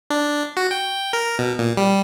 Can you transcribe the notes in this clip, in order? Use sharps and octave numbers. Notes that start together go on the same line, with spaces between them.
D4
F#4
G5
A#4
B2
A#2
G3